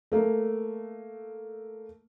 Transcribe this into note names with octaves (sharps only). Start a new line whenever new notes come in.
A3 A#3